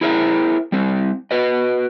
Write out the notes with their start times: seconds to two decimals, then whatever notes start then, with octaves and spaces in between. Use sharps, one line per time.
0.01 E4 G#4 A#4 C5 E5
0.72 G3 C4
1.31 F#4 B4 D#5